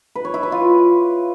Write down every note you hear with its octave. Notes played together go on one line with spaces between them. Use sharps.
B4
C#5
E4
B4
F4